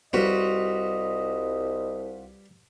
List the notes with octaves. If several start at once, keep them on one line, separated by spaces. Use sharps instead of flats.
C2 G3 F4 F#4 B4 D#5